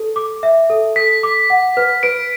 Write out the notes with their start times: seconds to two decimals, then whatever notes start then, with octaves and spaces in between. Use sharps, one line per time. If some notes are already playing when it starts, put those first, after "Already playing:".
Already playing: A4
0.16 D6
0.43 E5
0.70 A4
0.96 A4 B6
1.23 D6
1.50 F#5
1.77 B4
2.03 B4 D7